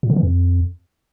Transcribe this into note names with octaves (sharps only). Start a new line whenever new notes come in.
A#2
D3
E3
F2